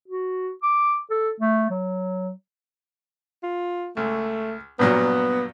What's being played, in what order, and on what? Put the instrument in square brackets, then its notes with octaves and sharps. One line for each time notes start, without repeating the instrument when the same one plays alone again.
[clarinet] F#4
D6
A4
A3
F#3
[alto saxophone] F4
[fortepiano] C#2 [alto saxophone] A3
[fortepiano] G2 A#2 F#3 [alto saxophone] B3